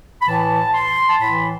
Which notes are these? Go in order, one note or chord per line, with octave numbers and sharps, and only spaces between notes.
B5
A2 E3 A5
C6
A5
A2 E3 B5